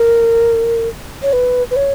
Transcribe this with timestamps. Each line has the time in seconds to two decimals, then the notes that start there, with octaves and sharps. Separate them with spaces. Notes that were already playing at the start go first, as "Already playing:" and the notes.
Already playing: A#4
1.22 C#5
1.33 B4
1.71 B4
1.76 C#5